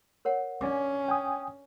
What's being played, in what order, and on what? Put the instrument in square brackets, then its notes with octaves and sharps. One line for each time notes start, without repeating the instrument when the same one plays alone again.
[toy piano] A#4 C#5 F#5
[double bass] C#4 [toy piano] D4 D5 D6
[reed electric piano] G5 G#5 D#6